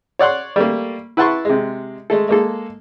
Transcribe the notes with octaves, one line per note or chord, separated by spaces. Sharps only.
C#5 D5 F#5 C6
G3 A3 A#3
E4 B4 F#5 A5 C6 C#6
C3 G#3
G#3 A3 A4
G#3 A#3 A4